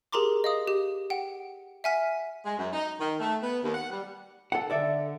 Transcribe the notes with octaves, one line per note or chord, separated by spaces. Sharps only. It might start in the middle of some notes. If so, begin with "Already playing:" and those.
G4 G#4 A#4 A#5 C6 D6
D#5 F5 D#6
G4
F#5 G5
E5 F#5 G#5 F6 B6
G#3
F#2
D#4
D#3
A3
B3
D#2
F#5
G3
A4 F#5
D3 A4 D5 E5